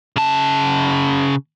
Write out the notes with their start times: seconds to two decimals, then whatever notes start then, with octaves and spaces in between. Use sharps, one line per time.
0.16 C#3 A5